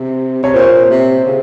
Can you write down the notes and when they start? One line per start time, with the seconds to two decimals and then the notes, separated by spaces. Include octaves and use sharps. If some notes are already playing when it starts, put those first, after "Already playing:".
Already playing: C3
0.43 C3 C#5
0.54 A#2 C5
0.90 C3
1.25 C#3